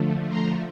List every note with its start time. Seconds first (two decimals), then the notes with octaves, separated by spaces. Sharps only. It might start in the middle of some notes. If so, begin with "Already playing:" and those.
Already playing: D3 F3 A3
0.29 A#5 C6